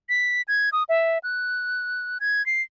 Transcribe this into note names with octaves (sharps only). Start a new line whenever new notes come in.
B6
G#6
D#6
E5
F#6
G#6
C7